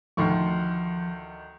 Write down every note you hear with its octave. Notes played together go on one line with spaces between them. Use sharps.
D2 D#3 F3 C6 C#6